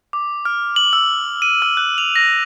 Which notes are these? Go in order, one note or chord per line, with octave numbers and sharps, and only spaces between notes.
D6
F6
F#7
E6
D#7
E6
F#6
F7
A#6